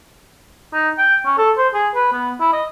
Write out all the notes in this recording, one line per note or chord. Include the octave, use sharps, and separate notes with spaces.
D#4
G5
C#4
A4
C5
G#4
B4
B3
E4
D#5